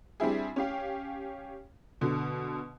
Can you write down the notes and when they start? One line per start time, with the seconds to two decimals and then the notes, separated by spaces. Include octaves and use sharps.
0.20 G3 C4 D4 E4 G#4
0.56 C#4 G4 F5
2.01 B2 D3